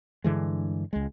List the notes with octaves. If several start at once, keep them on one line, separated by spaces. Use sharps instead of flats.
G2 D3 E3 G#3
C#2 G#3